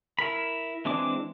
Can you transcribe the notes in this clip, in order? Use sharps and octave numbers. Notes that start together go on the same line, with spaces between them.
E4 A#4 B5
E3 G#3 C4 D4 D6